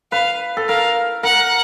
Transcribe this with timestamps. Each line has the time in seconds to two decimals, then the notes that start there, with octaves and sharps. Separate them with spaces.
0.12 B4 F5
0.57 A4
0.68 A#4 F5
1.23 A#4 F#5